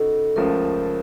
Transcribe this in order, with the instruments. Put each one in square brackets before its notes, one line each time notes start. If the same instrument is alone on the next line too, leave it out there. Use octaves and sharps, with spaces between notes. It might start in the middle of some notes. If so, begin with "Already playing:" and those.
Already playing: [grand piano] C#3 D#4 F#4 [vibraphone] A4
[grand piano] C#2 C#3 F3 A3 [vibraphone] A#4